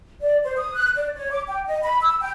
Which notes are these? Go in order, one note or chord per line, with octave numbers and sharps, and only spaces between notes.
D5
C5
D#6
F#6
D5
C#5
D6
G5
D#5
B5
E6
G5